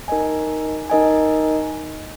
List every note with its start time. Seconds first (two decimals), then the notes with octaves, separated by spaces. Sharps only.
0.08 D#4 A#4 D#5 G#5
0.90 D#4 A#4 D#5 G#5